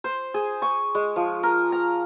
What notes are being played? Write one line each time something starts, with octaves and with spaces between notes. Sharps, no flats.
C5
G#4
C#6
G#3
F3
A#4
A#5